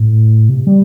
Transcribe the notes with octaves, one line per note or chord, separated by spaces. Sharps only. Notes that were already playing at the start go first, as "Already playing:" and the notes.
Already playing: A2
C3
G3